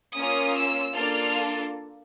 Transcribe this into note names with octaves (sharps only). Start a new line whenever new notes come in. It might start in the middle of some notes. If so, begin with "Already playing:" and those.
A#3 C#4 F4 D#6
E6
A#3 D4 F4 A4 F6